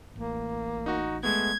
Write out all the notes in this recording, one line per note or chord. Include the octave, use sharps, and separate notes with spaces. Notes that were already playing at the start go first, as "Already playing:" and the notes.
A1 A2 A#3
D#4 F#4
G#3 A3 B3 G#6